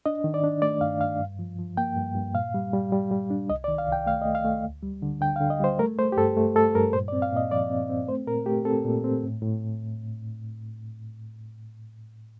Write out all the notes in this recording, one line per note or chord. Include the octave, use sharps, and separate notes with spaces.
D4 D#5
D#3
D5
D4
A3 D5
G2 F5
G2 F5
G2
F3
F3
A#3 G5
G2
G2
A#2 F5
G3
G3
G3
G3
D4
C2 D#5
D5
D#3
F5
C2 G5
A3 F5
D#5
A3
F5
A3
D2
G3
D3
D3 G5
F5
D3
D#5
G3 C5
A3 A#4
A3 C5
G4
G2 A4
A3
A3 A4
G2 A#4
A#2 C5
D5
C4
F5
A#2 D#5
F3 D5
C4
C4
A3 C5
A#2 A#4
A3 G4
C4 A4
A#2
C4
A2
A2